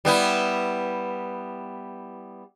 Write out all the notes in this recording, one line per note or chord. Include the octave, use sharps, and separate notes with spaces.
G3 B3 E4